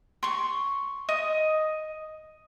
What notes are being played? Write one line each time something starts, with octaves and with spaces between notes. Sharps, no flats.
C6 C#6
D#5